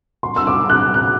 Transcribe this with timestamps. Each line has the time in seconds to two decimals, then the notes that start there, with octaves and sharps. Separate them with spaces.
0.23 C6
0.36 E6
0.47 D6
0.70 F#6
0.94 F#6